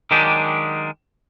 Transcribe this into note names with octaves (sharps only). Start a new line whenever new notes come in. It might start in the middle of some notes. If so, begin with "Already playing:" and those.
D#3 F#3 G#3 D4 G4